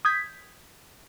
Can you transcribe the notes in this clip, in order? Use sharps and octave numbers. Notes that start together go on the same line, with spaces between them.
D#6 G6 G#6 B6